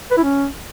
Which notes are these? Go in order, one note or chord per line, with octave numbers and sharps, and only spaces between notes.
B4
E4
C#4